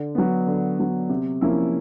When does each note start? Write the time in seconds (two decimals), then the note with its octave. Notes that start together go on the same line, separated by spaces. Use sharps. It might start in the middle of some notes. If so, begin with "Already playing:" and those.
Already playing: D3
0.15 F#3 B3
0.47 D3
0.78 F#3 B3
1.09 C3
1.41 F3 A#3 C#4 E4